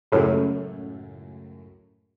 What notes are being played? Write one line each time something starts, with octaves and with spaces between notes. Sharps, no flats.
C#2 F#2 A2